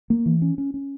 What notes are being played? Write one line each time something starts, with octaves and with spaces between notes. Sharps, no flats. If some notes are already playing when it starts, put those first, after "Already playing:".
A#3
E3
C#4
C#4
C#4